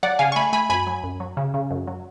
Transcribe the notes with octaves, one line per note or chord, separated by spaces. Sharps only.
F#3 D5 F#5
C#3 F5 G#5
C#6
A3 G#5 B5
A3 G#5 B5
F#2 G#5 B5
F#3
F#2
F#3
C#3
C#3
F#2
F#3